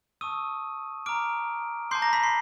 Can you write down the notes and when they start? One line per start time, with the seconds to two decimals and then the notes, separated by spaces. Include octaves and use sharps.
0.21 A5 C#6 D#6 E6 D#7
1.06 A#5 D6 F6 D7
1.91 A5 C6 D6 G6 C7
2.02 A#5 A#6
2.13 B5 B6
2.23 C6 C7